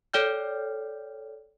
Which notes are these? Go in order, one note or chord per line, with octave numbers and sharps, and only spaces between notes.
A4 C#5 D5 G5 F6 G6